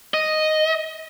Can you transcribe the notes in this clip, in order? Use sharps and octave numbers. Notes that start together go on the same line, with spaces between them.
D#5